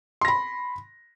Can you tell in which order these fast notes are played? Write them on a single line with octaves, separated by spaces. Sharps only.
C6 A#6 B5